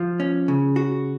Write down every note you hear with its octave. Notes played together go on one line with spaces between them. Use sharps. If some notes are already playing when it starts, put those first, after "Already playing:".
Already playing: F3
C#4
C#3
F#4